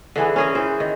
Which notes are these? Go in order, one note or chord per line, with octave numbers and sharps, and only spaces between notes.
D3 E3 G#4
C#4 G#4 A#4
E3 C5
D#3